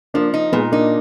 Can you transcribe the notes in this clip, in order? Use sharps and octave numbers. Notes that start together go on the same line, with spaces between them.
F3 A#3 D4
D#4
A#2 G#3 B3
A#3 D4 D#4